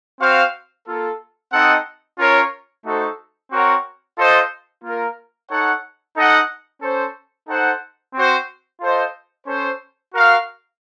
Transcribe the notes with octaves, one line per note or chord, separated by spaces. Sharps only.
C4 F#4 C5 F5
A#3 F4 A4
C4 D#4 A4 D#5 F#5
C#4 F4 A#4 C#5
A3 D#4 F#4 A4 C5
C4 F#4 A#4 C#5 F#5
F4 A4 C5 D#5
A#3 F4 A#4
D#4 A4 C#5 F#5
D#4 A4 D#5 F#5
C#4 A4 C5
D#4 A4 C5 F#5
C4 F#4 C5
F4 A4 C5 D#5
C#4 A4 C5
F#4 A#4 F5